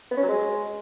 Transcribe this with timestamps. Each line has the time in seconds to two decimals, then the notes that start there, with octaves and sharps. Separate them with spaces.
0.11 B3
0.17 C#4
0.23 F#3
0.29 G#3